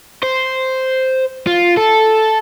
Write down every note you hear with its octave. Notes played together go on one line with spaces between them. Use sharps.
C5
F4
A4